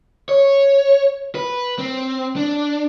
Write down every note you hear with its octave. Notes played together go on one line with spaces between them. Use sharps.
C#5
B4
C4
D4